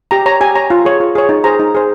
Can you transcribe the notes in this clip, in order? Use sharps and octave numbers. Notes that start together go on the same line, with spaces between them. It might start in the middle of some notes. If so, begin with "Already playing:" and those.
G4 A#5
C#5 A#5
G4 G#5
C#5 A#5
F4
G#4 C#5
F4
G#4 C#5
D#4
G#4 C5 A#5
D#4
G#4 C5